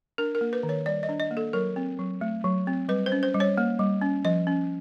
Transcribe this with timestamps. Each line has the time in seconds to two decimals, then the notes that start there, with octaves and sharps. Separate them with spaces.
0.18 D4 A#4
0.35 A#4
0.41 A#3
0.53 B4
0.63 D#3
0.69 C#5
0.86 G3 D5
1.03 D#5
1.09 D4
1.20 D#5
1.31 A#3
1.37 A4
1.53 F#3 A#4
1.76 C4
1.99 F#3
2.21 A3
2.44 F#3
2.67 C4
2.89 G3 B4
3.06 C5
3.12 C#4
3.23 C5
3.34 G3
3.40 C#5
3.58 A#3
3.79 G3
4.01 C#4
4.24 F3 D#5
4.47 C#4